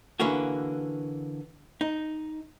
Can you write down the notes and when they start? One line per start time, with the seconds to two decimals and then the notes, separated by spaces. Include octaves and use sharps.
0.20 D3 E3 A#3 C#4 F#4
1.81 D#4